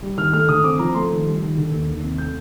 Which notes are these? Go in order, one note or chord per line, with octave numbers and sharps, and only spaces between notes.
G3
D#3 F6
A3 F6
D3 D#6
C4 D6
F3 A#5
A3 C6
D#3
G3
D#3
D3
D#2
D#3
C3
A3 G6